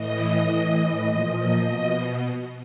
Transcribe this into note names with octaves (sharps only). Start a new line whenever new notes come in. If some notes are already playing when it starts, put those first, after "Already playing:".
Already playing: A2 E3 D#5
A2 E3
A#2 F3
B2 D#5